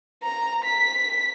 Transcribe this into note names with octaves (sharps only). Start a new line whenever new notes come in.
A#5
B6